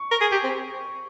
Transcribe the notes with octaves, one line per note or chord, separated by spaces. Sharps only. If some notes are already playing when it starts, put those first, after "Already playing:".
Already playing: C#6
A#4
G#4
G4
C4